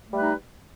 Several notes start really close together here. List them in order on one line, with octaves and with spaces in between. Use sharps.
A3 G3 B4 D#4